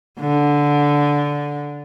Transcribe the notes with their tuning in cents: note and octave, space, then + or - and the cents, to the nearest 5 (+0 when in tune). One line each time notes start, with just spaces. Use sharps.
D3 -10